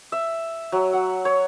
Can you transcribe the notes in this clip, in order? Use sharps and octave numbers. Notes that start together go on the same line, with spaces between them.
E5
F#3
F#5
C#5